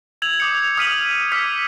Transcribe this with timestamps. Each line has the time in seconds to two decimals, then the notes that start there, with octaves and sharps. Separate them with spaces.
0.22 E6 G#6 F7 F#7
0.40 D6 D#6 G6 C#7
0.77 D#6 F6 B6 D#7 F7 F#7
1.32 D6 E6 F6 G#6 B6 C#7